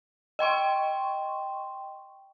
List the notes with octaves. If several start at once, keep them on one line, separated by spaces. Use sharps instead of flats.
D#5 G5 C6 C#6